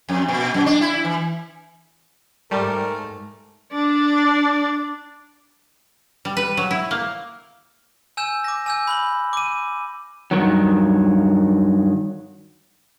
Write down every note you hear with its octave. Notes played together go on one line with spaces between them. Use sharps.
F2
A#2
F#2
D4
E4
E3
G#2 G3 A3 A#4
D4 D5
G3
B4
F#3
E4
A#3
G#5 E6 G6 E7
D6 A#6
G#5 E6 G6
B5 F#6 F#7
D6 D#7
G2 D#3 F#3